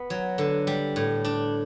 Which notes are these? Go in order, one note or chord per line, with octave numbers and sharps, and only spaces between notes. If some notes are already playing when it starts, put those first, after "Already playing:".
Already playing: B3
F#3
D3
G3
A2
D4